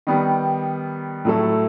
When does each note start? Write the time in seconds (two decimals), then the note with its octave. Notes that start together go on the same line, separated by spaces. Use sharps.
0.07 D#3 G3 B3
1.25 A2 F#3 A3 E4 A4